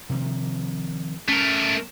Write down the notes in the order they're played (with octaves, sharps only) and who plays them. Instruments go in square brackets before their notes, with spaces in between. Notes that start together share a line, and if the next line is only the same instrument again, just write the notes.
[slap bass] C3 D#3 F3
[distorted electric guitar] A3 A#4 [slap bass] C#4